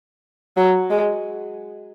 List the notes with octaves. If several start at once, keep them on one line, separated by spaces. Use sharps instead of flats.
F#3
G#3